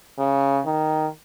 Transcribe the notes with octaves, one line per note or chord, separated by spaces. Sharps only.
C#3
D#3